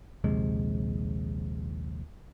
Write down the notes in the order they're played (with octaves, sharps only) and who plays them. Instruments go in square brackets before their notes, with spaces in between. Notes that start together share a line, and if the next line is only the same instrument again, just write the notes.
[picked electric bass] A#1 D#2 C3 G#3